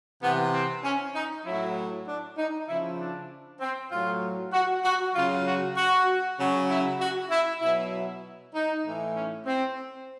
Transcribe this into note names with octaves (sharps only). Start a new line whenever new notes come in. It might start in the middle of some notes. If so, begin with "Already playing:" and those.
C3 E3 B3
C4
C#4
D#4
A2 F#3 E4
D4
D#4
C#3 F3 E4
D4
C4
A2 F#3 F4
F#4
F#4
C#3 F#3 F4
F#4
F#4
C#3 F#3
E4
F#4
E4
B2 F#3 E4
E4
D#4
A2 E3
C#4
C4